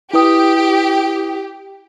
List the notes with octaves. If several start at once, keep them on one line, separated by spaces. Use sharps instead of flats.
E4 G4 B4 D#6